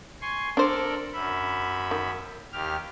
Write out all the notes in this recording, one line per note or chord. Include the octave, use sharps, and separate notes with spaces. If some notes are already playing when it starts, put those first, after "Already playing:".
G#5 C6 C#6
D4 A4 A#4 C5 D5
F#2 E5 B5
D#3
D#2 G4 F6